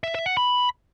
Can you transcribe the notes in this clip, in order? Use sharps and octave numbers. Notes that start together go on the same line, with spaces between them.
E5
E5
F#5
B5